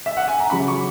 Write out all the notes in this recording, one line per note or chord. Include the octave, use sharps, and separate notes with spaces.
E5
F#5
G#5
A#5
C#3 F#3 B5
C#6